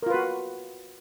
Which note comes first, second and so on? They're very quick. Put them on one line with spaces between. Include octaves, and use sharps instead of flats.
A#4 F4 B4 F#4